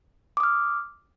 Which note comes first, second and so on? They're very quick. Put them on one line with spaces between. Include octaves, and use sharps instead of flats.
D6 D#6 F6